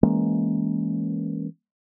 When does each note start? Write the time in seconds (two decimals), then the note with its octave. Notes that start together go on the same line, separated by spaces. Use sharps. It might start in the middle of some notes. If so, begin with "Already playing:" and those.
0.03 E3 G#3 A#3 C#4